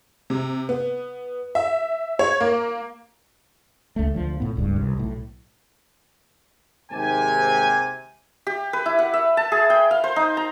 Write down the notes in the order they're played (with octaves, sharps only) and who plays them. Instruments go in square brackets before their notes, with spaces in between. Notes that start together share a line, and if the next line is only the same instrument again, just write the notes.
[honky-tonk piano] C3
B3
E5
C#5
A#3
[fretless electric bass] C#2 A3
D2 F3
A2 B3
D1 C#2 G2
C2
B1 A2
[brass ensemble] D#2 G#2 C3 C4 G4 G#5
[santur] G4
B4
E4
F#5
E5
A5
G#4
G5
F5
C5
D#4
A#5